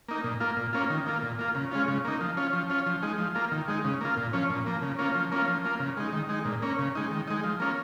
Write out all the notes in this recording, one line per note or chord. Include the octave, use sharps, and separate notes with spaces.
A#3 D#4
A#2
A#3 F4
A#2
A#3 C#4 F4
D#3
A#3 F4
A#2
A#3 F4
C#3
G#3 C#4 F4
C#3
A#3 D#4
F3
C#4 F4
F3
C#4 F4
F3
G#3 D#4
F3
A#3 F4
D#3
G#3 D#4
C#3
A#3 F4
A#2
F3 C#4
A#2
F3 A#3
C#3
A#3 C#4 F4
F3
A#3 C#4 F4
F3
A#3 F4
C#3
G#3 D#4
D#3
G#3 D#4
A#2
A#3 C#4
C#3
G#3 D#4
D#3
G#3 D#4
F3
A#3 C#4 F4